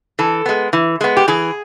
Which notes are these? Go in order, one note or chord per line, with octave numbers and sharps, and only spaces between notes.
E3 A4
G#3 B3
E3
G#3 B3
G4
E3 G#4